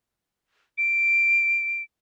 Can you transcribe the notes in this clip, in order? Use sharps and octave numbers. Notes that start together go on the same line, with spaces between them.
D7